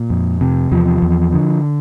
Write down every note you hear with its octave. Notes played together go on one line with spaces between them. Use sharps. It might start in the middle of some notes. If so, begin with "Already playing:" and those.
Already playing: A#2
F2
C3
E2 F3
E2
D3